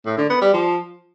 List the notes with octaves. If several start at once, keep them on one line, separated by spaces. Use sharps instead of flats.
A2
D3
B3
G3
F3